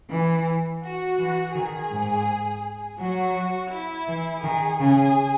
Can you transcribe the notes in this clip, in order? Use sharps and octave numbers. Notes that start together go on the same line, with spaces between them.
E3
F#4
E3
D#3 G#4
G#2
F#3 F#4
E4
E3
D#3 G#4
C#3 G#4